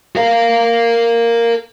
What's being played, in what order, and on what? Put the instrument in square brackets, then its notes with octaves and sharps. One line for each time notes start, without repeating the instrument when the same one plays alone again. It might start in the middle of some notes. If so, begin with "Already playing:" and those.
[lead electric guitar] A#4 F5